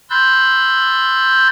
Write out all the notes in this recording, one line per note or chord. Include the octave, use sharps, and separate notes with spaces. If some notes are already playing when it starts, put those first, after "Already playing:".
B5 C6 E6 F#6 G6 A6